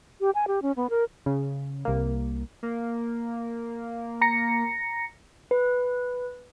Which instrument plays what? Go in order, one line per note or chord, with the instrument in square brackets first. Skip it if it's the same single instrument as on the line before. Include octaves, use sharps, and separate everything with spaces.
[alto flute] G4
G#5
G4
C#4
B3
A#4
[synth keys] C#3
C2 A#3
[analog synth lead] A#3
[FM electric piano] A#5 A#6 C#7
[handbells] B4